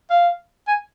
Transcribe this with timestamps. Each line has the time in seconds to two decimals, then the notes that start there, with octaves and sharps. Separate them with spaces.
0.10 F5
0.68 G#5